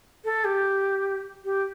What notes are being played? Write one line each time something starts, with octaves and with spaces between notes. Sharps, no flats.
A4
G4
G4